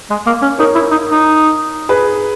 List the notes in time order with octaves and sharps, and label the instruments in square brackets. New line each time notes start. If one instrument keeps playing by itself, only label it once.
[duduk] G#3
A#3
C#4
[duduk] D#4 [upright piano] A#4 C#5
[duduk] E4
D#4
D#4
[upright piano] G#4 B4